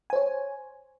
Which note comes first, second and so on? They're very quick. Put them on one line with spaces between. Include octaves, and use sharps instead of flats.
G#5 C5 C#5